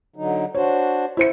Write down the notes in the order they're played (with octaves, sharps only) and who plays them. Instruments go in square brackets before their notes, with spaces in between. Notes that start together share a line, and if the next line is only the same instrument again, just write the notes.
[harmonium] D3 F#3 D#4
[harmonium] D4 F#4 C5 [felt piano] C#5
[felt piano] E4 C5 C#7